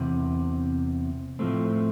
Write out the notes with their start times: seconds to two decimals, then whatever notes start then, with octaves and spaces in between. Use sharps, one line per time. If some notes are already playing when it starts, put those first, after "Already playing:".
Already playing: E2 C3
1.39 A2 F3 A3 C4